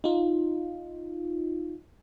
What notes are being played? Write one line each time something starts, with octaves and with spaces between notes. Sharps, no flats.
D#4 F4